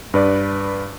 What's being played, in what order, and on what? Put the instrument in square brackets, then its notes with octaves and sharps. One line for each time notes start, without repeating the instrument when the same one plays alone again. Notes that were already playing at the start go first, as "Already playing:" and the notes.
[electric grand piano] G2 B4 D5